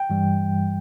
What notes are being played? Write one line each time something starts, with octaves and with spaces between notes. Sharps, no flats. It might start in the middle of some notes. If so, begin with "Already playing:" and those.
Already playing: G5
G2 E3 G3